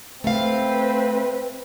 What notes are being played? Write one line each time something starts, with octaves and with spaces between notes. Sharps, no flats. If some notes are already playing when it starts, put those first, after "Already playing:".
A3 C4 B4 F5